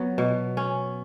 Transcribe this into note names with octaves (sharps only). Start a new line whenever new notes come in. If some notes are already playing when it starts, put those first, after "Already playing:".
Already playing: F#3 B3
B2
C#4